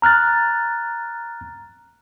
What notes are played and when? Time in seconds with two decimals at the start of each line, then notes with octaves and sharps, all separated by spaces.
0.02 A#5 F6 F#6 A6